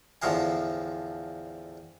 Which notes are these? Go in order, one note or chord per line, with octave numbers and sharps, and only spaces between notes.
E2 A2 D3 F3 F5 G#5